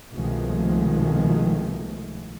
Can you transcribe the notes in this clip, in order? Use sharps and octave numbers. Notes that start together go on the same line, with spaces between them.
C2 B2 D#3 F3 G#3 A3